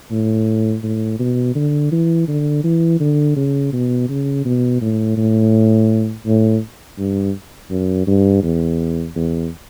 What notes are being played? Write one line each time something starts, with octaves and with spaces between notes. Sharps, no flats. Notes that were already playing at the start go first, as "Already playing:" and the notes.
A2
A2
B2
D3
E3
D3
E3
D3
C#3
B2
C#3
B2
A2
A2
A2
G2
F#2
G2
E2
E2